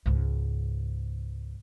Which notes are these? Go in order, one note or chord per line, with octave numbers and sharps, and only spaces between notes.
C#2 G#2